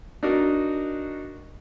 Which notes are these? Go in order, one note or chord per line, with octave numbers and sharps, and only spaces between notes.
D4 D#4 F#4 A#4